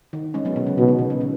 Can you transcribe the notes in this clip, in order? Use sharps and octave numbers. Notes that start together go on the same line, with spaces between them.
D#3
G#3 C#4
F#3 B3
B2
C#3
B2 D#3
C#3
B2
C#3
D#3